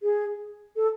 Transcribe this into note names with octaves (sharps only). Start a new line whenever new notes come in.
G#4
A4